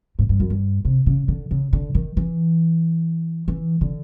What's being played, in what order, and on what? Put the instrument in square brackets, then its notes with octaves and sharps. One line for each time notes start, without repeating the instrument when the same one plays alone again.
[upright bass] G#2
G2
F#2
G2
C3
C#3
D3
C#3
D3
D#3
E3
E3
D3